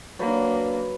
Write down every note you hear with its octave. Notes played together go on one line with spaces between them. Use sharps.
F#3 A#3 D4 B4